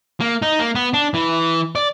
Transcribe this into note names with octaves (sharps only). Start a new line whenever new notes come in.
A#3
D#4
A#3
B3
D4
E3
D5